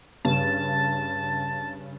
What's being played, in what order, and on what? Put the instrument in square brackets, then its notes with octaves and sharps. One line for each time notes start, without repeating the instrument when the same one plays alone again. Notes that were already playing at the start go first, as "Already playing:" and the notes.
[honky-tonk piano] G2 C#3 [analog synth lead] A5